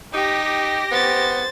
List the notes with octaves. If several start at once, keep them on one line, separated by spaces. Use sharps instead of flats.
D#4 G4 A#6
B3 C5 A6